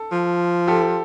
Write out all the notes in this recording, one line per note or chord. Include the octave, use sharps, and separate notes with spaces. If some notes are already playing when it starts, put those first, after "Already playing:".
Already playing: A4
F3
G4 A4